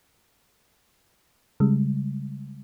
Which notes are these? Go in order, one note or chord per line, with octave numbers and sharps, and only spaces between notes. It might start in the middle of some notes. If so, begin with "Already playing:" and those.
C#3 G3 G#3